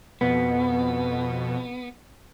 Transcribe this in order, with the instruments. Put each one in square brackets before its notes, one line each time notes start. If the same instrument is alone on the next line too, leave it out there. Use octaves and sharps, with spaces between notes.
[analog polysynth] F2 B2 [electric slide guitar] B3